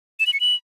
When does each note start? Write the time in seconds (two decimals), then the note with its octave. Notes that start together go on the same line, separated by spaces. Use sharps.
0.20 E7
0.27 F#7
0.33 C#7
0.40 F#7